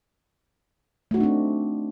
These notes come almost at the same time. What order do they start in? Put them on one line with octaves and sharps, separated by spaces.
A3 F#4 D#4 D4 C4